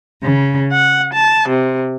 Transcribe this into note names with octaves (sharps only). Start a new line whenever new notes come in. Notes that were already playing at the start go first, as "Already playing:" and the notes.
C#3
F#5
A5
C3